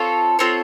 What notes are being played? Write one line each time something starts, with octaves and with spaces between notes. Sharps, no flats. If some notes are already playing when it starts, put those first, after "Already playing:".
Already playing: C4 F4 A4 C#5
C4 F4 A4 C#5